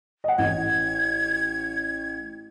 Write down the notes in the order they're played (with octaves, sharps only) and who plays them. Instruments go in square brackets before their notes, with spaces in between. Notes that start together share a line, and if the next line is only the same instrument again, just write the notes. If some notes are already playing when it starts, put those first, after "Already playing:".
[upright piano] D#5 F#5
[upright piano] A1 [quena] G#6